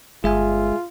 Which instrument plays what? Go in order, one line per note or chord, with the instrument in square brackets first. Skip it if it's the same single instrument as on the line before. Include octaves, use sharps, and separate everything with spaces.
[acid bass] G1 [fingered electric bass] G#3 [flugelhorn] F4 [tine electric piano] G#4 E5 G#5